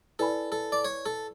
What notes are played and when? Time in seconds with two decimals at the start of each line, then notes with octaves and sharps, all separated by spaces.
0.19 E4 A4 B4 D5 G#5 B5
0.52 A4
0.72 D5
0.85 C#5
1.06 A4